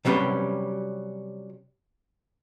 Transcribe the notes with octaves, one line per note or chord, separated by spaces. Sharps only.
C3 F#3 G3 C#4 G4 B4